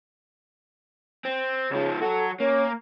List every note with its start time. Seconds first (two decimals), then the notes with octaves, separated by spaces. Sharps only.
1.25 C4
1.71 C#2 C#3 F3
2.02 F#3 F#4 A4
2.40 A#3 C#4